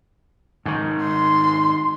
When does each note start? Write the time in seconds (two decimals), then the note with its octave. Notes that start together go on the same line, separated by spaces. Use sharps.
0.65 G#2 D#3
1.04 C6